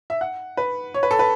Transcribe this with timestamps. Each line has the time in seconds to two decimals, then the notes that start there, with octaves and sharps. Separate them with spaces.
0.10 E5
0.21 F#5
0.57 B4
0.94 C#5
1.03 B4
1.11 A4
1.19 B4